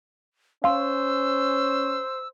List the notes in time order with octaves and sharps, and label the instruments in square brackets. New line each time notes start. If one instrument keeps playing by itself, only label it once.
[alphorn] C#4 [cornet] C5 [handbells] F5 C6 [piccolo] E6